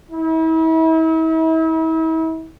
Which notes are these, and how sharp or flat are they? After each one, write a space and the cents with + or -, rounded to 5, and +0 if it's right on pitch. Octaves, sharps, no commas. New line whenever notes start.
E4 -40